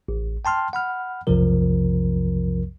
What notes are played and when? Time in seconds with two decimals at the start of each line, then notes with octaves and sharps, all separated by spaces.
0.08 A1
0.45 G5 A5 C6 F6
0.73 F#5 B5 F6
1.27 B1 F2 C3 F3 A#4